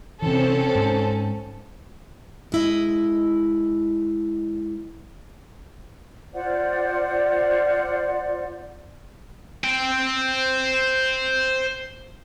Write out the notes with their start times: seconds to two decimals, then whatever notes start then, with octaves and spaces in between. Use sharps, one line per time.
0.22 C3 E3 C4 C#4 A4
0.75 G#2
2.52 G#3 E4 D#5
6.33 F4 C5 D5 F#5
9.64 C5 G5